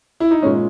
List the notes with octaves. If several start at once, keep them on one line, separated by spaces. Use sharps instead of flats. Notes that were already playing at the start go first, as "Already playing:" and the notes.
E4
D#4
A#2 G#3 C#4